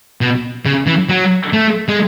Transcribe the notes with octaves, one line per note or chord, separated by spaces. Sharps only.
B2
C#3
E3
F#3
A3
G#3